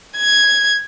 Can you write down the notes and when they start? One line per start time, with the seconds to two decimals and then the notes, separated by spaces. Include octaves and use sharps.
0.17 G#6